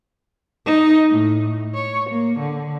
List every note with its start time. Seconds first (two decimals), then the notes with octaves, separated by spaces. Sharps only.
0.66 D#4
1.11 A2
1.75 C#5
2.09 A#3
2.39 D3